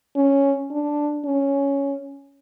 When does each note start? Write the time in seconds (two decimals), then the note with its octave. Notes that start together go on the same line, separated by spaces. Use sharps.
0.16 C#4
0.71 D4
1.25 C#4